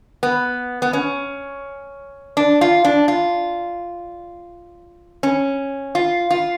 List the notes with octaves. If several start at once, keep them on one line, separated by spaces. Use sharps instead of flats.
B3
B3
C#4
D4
F4
D4
F4
C#4
F4
F4